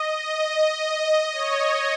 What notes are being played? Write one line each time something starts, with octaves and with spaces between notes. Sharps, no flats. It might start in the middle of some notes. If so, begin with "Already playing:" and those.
Already playing: D#5
D#5
D#5
C#5